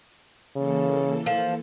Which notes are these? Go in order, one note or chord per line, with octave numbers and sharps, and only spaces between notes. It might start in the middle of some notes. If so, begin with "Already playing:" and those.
C#3 E3 A#3 A4
F3